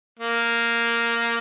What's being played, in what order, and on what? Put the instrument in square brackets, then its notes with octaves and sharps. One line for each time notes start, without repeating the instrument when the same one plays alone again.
[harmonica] A#3